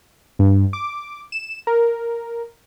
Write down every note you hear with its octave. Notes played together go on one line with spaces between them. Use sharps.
G2
D6
E7
A#4